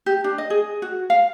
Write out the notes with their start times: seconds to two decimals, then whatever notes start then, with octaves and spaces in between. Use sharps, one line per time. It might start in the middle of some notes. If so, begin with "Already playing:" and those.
0.06 G4
0.24 D4
0.38 D#5
0.50 G#4
0.82 F#4
1.10 F5